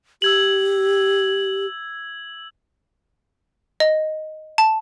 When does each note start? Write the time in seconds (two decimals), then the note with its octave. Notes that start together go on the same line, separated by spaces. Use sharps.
0.22 G4 E6 G#6 F#7
3.80 D#5
4.58 A5